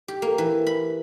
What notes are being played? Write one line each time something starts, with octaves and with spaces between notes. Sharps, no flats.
G4
A#3
E3
B5